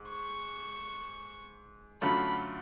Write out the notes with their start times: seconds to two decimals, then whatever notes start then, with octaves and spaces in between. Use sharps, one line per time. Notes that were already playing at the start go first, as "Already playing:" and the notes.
Already playing: G#2
0.09 C#6
2.01 F#2 D3 F#3 A3 F4 B5